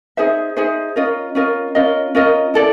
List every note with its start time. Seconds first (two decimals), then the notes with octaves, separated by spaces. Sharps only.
0.17 D#4 G#4 C5 E5
0.57 D#4 G#4 C5 E5
0.96 C#4 F4 A#4 D#5
1.35 C#4 F4 A#4 D#5
1.75 C#4 F4 A#4 D#5
2.15 C#4 F4 A#4 D#5
2.54 E4 A4 D5